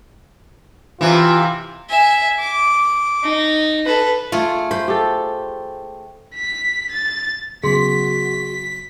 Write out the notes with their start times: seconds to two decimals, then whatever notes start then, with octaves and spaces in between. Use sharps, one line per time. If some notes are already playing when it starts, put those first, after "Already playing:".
1.01 C3 E3 F4
1.89 E5 G#5
2.39 D6
3.23 D#4
3.86 A4 B4
4.32 A3 F4 G#4
4.71 C5 B5
4.88 G4 A4
6.34 B6
6.91 A6
7.63 C#3 F#3 B3 F#4 G#4 C6 B6